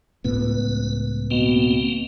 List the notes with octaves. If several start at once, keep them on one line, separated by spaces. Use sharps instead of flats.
C#2 A2 B3 B4
B2 A#3 C4